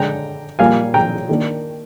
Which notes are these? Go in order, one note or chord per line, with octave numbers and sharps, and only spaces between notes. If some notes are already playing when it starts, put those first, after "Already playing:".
Already playing: D3 G#3 D4 G5 A#5
A#2 G3 A#3 F5 G#5
G5 A#5
D#3 A#3 D4